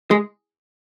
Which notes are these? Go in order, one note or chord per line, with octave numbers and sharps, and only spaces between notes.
G#3